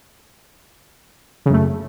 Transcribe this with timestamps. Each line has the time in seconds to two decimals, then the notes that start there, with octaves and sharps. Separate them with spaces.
1.46 C#3
1.50 F#2
1.53 A3